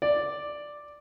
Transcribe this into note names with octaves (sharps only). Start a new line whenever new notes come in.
D5